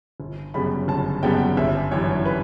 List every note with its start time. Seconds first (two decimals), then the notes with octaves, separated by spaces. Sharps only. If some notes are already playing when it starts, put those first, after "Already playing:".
0.20 G1
0.54 F#2 C#3 G3 B3 B5
0.88 G1 A5
1.23 F#2 C#3 G3 B3 G5
1.57 G1 E5
1.91 F#2 E3 G3 C#5
2.26 B4